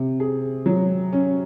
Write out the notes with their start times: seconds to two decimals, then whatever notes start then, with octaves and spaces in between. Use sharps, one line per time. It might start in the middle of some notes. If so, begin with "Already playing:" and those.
Already playing: C3
0.20 G#4
0.66 F#3
1.13 C#4